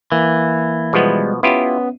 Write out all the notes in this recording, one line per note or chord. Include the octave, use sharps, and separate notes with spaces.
E3 A#3
B2 F3 G3 G#3 B3
B3 C#4 E4 F4 G4